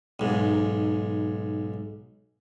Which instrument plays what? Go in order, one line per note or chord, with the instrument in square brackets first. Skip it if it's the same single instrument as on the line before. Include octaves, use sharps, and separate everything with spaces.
[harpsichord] B1 G#2